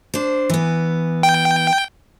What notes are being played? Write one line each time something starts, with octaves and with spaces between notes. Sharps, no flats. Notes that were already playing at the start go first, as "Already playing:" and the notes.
D4 C5
E3 B3
G5